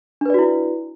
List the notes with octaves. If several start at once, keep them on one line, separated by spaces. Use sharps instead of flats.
D4 E4 F#4 B4 D5